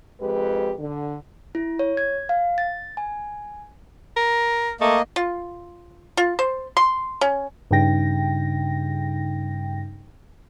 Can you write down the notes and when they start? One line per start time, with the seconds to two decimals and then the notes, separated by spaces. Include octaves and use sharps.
0.21 F2 G#3 G4 B4
0.79 D3
1.55 E4
1.79 C#5
1.97 G#6
2.29 F5
2.58 A6
2.97 G#5
4.16 A#4
4.81 A3 A#3 D#5
5.16 F4
6.17 F4
6.39 C5
6.77 C6
7.21 C#4
7.71 G2 C#3 D#4 G5 A#6